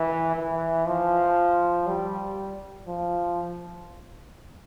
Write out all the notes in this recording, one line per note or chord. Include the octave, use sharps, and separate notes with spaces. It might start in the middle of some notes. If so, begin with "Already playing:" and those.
Already playing: E3
E3
F3
G3
F3